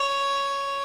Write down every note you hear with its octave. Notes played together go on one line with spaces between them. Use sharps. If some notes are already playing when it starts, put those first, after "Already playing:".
Already playing: C#5